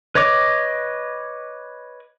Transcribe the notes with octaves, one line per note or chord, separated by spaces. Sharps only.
B4 C#5 D#5 D6